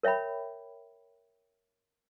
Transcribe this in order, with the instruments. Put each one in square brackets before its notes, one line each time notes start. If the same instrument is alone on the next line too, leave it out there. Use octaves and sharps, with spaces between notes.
[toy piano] A#4 C#5 E5 G5 B5